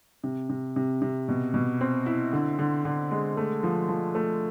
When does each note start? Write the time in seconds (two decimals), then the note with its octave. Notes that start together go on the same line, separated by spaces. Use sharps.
0.24 C3
0.49 C3
0.76 C3
1.02 C3
1.28 B2
1.54 B2
1.81 C4
2.06 E4
2.33 D3
2.59 D3
2.85 D3
3.11 G#3
3.37 A3
3.63 F3
3.89 F3
4.15 A3